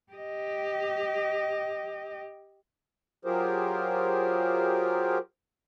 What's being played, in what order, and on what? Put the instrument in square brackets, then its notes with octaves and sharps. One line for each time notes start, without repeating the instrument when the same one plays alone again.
[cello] G4 D#5
[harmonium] F#3 F4 G4 G#4 A#4 C5